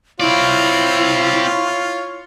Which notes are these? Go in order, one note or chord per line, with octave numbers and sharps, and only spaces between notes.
C4 E4 F4 C#5 D5